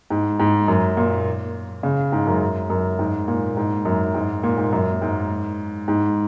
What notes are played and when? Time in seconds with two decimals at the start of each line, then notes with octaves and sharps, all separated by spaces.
0.10 G#2
0.39 G#2
0.68 F#2
0.97 A#2
1.83 C#3
2.12 G#2
2.27 F#2
2.70 F#2
2.99 G#2
3.28 A#2
3.57 G#2
3.85 F#2
4.14 G#2
4.43 A#2
4.58 G#2
4.73 F#2
5.02 G#2
5.88 G#2